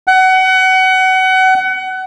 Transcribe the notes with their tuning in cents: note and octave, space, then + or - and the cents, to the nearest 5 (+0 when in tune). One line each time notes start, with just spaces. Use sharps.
F#5 +25